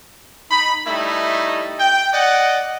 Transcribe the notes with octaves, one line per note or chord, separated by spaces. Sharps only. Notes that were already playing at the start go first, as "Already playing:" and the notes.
D#4 B5
G3 A3 D#4 E4
G5
D5 D#5 F#5